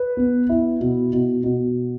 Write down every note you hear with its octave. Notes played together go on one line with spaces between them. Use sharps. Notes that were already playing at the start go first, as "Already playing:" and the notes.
Already playing: B4
B3
E4
B2
B2
B2